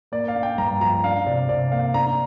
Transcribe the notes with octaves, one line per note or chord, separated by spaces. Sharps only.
A#3 D5
F5
D4
G5
G2 A#5
F3 A#5
D4 F5
C3 D5
C3 D5
A#3 F5
D4 A#5